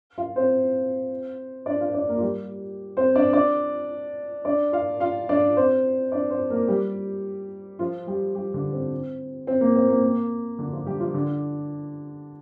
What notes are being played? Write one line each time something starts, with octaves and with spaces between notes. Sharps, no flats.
F4 F5
C4 C5
D4 D5
F4 F5
D4 D5
A#3 A#4
F4
G3 G4
C4 C5
D4 D5
D4 D5
D4 D5
F4 F5
F4 F5
D4 D5
C4 C5
D4 D5
C4 C5
A#3 A#4
G3 G4
F3 F4
G3 G4
G3 G4
D3 D4
C4
C4
A#3
C4
A#3
A#3
D3 D4
F3 F4
G3 G4
F3 F4
D3 D4